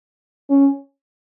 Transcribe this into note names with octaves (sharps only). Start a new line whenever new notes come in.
C#4